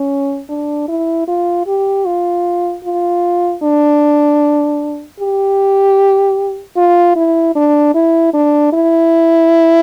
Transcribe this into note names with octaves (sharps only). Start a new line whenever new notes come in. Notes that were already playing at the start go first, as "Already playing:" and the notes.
Already playing: C#4
D4
E4
F4
G4
F4
F4
D4
G4
F4
E4
D4
E4
D4
E4